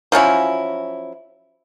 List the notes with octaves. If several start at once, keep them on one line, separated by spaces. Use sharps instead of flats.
F3 F#3 C#4 E4